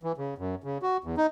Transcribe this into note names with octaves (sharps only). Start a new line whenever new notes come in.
E3
C#3
F#2
C#3
F#4
E2
D#4